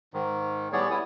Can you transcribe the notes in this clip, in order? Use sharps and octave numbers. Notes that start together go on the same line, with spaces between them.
G#2 D#3
A2 G3 B3 G#4 C#5 D5
G3 B3 E4 D#6